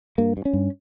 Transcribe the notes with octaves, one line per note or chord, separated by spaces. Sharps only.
G2 A#3
G2
C#4
G2